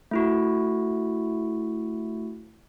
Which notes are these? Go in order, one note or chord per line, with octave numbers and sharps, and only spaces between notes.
A3 E4 F#4